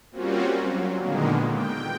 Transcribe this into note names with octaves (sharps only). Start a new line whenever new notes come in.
G3 A#3 C4 C#4 F4 F#4
F#3
A#2 D3 D#3 G#3 A#3 B3
G5